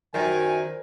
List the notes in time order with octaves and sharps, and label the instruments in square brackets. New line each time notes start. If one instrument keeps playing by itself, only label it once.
[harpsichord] F#2 [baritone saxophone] D#3 [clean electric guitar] A#4 C5 D5 [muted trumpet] G#5